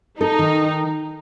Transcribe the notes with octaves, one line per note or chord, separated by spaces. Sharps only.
D#4 A4
D#3